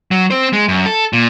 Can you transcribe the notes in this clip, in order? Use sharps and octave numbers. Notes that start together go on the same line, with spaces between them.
F#3
C4 C5
G#3
F#2
A4
A#2